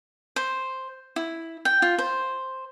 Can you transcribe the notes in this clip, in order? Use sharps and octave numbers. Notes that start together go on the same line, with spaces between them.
C5
E4
G5
F4
C5